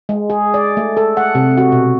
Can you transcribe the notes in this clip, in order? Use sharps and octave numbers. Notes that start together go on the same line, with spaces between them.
G#3
G#4
D5
A3
A4
F#5
C3
F#4
B2